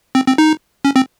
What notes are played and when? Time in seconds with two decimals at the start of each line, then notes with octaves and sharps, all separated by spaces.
0.15 C4
0.27 C4
0.38 D#4
0.85 C#4
0.96 C4